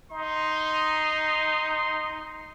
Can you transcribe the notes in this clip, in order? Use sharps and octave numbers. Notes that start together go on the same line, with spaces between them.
D#4 C6